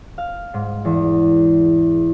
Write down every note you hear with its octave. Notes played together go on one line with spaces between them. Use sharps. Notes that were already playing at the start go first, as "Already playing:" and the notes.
F5
G#2
E2